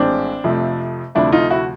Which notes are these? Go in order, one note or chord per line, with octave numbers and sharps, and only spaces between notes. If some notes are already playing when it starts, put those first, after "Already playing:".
Already playing: A#1 A2 E3 G#3 C4 D4
F2 C3 F3 A3
D2 C3 F3 A3 D4 E4
D#4 F4
E4 F#4